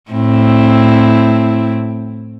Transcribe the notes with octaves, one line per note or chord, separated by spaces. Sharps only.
A2 C4 E4